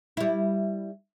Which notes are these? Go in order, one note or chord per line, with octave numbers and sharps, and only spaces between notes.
G3 E4